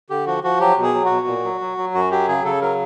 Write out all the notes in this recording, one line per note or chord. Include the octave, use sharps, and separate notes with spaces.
D3 G4
F3 F#4
F3 F#4
F#3 G4
B2
G#4
F#3
F#4
B2
A#2
F#3
F#3
F#3
F#2 F#4
F#3 G4
C#3 G#4
C#3 A4
F#3 A#4